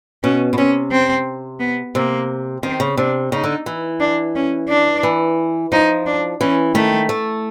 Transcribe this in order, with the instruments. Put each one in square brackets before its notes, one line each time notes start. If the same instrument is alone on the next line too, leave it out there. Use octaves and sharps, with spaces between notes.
[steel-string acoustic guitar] B2 [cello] C#4
[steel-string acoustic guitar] B2
[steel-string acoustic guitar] C3 [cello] C#4
[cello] C4
B3
[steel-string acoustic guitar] C3 [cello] A#3
[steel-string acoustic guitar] D#3 [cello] C4
[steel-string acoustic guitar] C#3
[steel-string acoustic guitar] C3 [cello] D4
[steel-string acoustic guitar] C#3 [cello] D#4
[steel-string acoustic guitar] D3
E3
[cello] D4
C#4
D4
[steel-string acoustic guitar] E3
[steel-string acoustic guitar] F3 [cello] D#4
[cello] D4
[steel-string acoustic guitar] E3 [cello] C#4
[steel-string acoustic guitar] D#3 [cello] A3
[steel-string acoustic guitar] A3